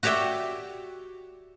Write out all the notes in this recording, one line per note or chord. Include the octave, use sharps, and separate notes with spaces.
F#4 G4 C#5 D5 E5 G5